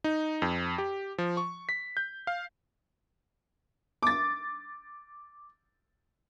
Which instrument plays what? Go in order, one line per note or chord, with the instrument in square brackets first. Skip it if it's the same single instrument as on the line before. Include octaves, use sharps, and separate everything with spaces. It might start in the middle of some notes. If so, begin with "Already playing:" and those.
[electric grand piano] D#4
F2
G4
F3
C#6
B6
G6
F5
[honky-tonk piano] D6 A6